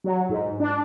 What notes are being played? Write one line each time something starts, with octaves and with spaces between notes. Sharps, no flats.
F#3
G#2
D4